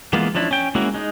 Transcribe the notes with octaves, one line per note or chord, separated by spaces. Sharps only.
E3 G#3 A#3 B3 F4
F3 C#4 D4 E4
C#4 G5
G#3 A#3 C#4 E4 F#4
G#3 D#4